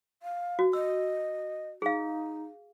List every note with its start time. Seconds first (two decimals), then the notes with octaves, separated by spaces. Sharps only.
0.23 F5
0.59 F#4
0.73 D#5 E6
1.82 D#4 G#4 F5